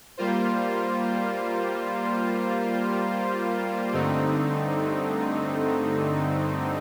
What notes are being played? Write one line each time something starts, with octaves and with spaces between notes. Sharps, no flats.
G3 A#3 F4 C5
G2 D3 A3 C4 D#4